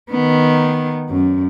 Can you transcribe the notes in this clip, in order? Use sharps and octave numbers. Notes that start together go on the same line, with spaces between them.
D#3 B3
F#2